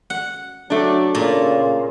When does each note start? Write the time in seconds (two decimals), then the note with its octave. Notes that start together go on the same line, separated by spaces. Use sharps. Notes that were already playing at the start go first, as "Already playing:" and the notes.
0.10 F#5
0.70 F#3 A3 D4
1.15 A#2 C#3